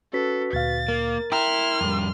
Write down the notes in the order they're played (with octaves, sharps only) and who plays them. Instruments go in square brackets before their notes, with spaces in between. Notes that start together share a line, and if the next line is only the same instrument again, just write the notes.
[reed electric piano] C#4 [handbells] F#4 B4 B6 [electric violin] A4
[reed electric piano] D2 A#2 F5 [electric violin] A6
[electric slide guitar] A#3 [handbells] A#4
[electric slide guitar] E4 [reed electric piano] G5 A#5 [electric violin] C6 F6
[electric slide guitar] F2 G3